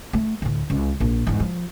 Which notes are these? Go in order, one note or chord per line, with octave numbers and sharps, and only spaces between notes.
A3
D2 A2
C#2
A#1
E2 G#2
F3